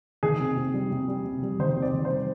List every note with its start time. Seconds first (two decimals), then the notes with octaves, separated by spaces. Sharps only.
0.23 D#3 G#4
0.39 C3
0.57 C3
0.74 G3
0.91 C3
1.08 G3
1.25 C3
1.43 G3
1.59 D#3 C5
1.76 C3
1.82 D5
1.93 D#3
2.05 C5
2.10 G3